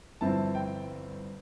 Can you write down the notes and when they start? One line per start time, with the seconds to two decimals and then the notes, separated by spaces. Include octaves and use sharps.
0.21 G1 G2 F3 C4 E4 A5
0.55 G5